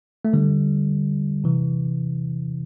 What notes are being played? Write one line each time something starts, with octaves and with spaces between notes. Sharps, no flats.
A3
D3 G3
C3 E3